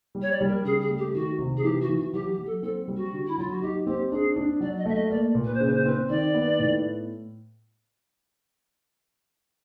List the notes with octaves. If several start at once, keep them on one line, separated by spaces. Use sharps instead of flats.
G3
C#5
D5
G3
A#4
C#3 G#4
G#4
A3
G4
D#3 F#4
C3
G#4
E3 G4
F#4
E3
F#4
F#3 G4
G4
F#3
A4
C4 A4
G3
F#4
D3
E4
F#3 F4
F#4
D#4 G4
C4 G4
D4 G#4
D4
F#3 D5
D#5
A3 E5
D#5
A#3 D5
A#2
B4
C5
C#3 B4
C5
C4 B4
D#3 D5
B3
A2